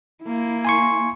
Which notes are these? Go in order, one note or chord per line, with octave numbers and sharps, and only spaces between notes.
A#3 E4
G#5 C6 C#6